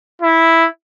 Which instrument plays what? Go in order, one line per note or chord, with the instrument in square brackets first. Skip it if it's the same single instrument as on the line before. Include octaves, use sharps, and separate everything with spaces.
[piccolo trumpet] E4